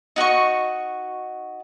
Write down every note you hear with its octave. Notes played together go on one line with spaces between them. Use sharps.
D#4 F#4 D#5 C#6